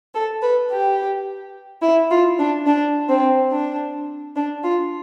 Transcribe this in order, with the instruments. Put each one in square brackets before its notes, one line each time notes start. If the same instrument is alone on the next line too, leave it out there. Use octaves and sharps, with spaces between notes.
[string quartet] A4
B4
G4
E4
F4
D4
D4
C4
D4
D4
F4